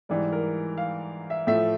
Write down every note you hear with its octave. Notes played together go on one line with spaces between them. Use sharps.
G#2 E3 G3 D5
A#4
F5
E5
A2 F3 A3 E5